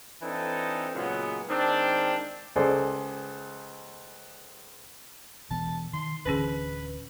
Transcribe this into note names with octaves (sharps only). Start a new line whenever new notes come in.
E3 C4 D4 D#4 A4
A#2 C#3 F#3 G#3 B3
D#3 G#3 C4 D4
C#2 G#4 A4 C5 D5
B2 E3 B3 A5
D#3 C6
D1 D3 E3 C#4 G#4 B4